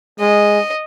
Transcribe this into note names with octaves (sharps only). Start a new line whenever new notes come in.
G#3 D#5